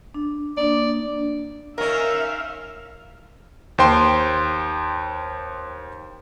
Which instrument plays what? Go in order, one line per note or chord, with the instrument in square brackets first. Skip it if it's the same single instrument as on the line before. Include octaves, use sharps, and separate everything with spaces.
[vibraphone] D4
[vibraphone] A#3 D4 [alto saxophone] D5
[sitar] D#3 C#4 [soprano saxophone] A#4 [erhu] E5 [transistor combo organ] F5
[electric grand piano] D#2 C5 G5 C6